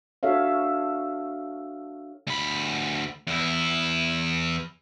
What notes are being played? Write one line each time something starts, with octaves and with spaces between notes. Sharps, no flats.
D4 F#4 A4 C#5 E5 F5
D2 B5
E2 E4